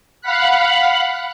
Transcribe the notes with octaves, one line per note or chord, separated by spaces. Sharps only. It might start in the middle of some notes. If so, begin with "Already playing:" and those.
F5 F#5 B5 F#6